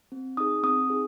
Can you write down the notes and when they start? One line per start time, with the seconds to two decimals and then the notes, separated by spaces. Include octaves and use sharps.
0.12 C4
0.37 D#4 G#4 D#6
0.63 C4 D#6
0.90 D#4 G#4